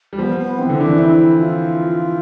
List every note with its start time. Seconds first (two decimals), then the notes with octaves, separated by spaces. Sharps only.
0.13 G3
0.19 F3 B3
0.39 B3
0.59 E3 C4
0.70 D3
0.78 E3 D4
0.98 C4 E4
1.38 F4